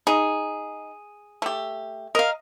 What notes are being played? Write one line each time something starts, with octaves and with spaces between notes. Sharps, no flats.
D#4 G#4
A3 G4
A#4 D#5 F5